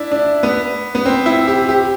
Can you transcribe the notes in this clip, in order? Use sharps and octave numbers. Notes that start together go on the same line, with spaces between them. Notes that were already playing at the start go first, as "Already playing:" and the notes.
Already playing: D4 E4
D4
B3
B3
C4
E4
G4
G4